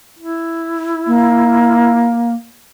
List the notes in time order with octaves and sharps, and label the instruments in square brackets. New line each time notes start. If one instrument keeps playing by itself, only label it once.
[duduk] E4
[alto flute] A#3